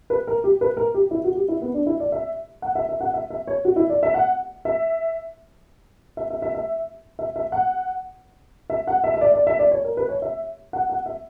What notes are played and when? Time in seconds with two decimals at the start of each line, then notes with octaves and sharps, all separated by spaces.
0.10 B4
0.27 A#4
0.44 G4
0.61 B4
0.77 A#4
0.94 G4
1.11 E4
1.24 F#4
1.36 G4
1.48 E4
1.62 B3
1.74 D4
1.86 E4
2.00 D5
2.12 E5
2.62 F#5
2.75 E5
2.89 E5
3.01 F#5
3.14 E5
3.30 E5
3.47 C#5
3.65 F#4
3.76 E4
3.90 D5
4.03 E5
4.14 F#5
4.65 E5
6.17 E5
6.30 E5
6.42 E5
6.55 E5
7.19 E5
7.36 E5
7.52 F#5
8.70 E5
8.87 F#5
9.04 E5
9.14 E5
9.21 D5
9.34 D5
9.47 E5
9.59 D5
9.71 C#5
9.84 A#4
9.97 B4
10.09 C#5
10.22 E5
10.73 F#5
10.89 F#5
11.06 E5